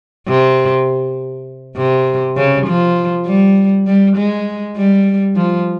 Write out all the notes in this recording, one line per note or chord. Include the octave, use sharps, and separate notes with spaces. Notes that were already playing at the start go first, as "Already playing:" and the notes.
C3
C3
C#3
F3
G3
G3
G#3
G3
F3